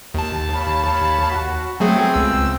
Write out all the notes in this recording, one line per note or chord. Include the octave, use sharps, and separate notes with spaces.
D#2 A5
C#5 F5 B5
F#4
F#3 A3 B3 C4 G#4 G5
C#2 E6